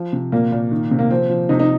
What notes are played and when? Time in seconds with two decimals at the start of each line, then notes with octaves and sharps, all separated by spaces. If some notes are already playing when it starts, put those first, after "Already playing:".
Already playing: F3
0.13 C3
0.32 A#2 A#3
0.52 A#2
0.71 D#3
0.91 C3
0.99 A#3
1.11 F3 C4
1.30 F3
1.49 C3 D#4
1.59 D#4